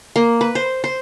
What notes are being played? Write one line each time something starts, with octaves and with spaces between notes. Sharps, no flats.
A#3
B4
C5
C5